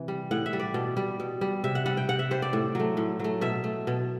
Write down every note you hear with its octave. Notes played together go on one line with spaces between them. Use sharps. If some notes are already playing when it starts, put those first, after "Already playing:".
Already playing: C3 E3
G3
A2 F#5
E5
G3
D5
B2
G3
B2
G3
C3 E5
F#5
G3 F#5
G5
C3 F#5
E5
G3 C5
D5
A2
F#3 A3
A2
F#3 A3
B2 E5
A3
B2